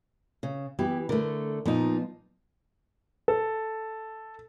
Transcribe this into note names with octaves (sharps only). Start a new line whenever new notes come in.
C#3
E3 B3 E4 G4
D3 A3 A#4
A#2 F3 B3 D#4 F4
A4